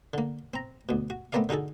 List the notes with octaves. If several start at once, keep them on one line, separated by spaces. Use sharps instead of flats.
D3 A#3
C4 A#5
D2 B2
F#4
A3 B3 C4 A#4 D5 F5
D3 D#4 F#4 G#4 A4